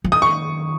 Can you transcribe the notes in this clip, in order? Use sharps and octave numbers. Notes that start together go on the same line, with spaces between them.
F3
D#3 D#6
C#6